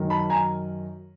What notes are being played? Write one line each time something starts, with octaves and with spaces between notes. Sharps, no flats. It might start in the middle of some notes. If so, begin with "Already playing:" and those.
Already playing: F#2 D#3 F#3
A5 B5
G#5 A#5